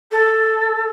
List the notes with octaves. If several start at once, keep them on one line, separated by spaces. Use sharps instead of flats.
A4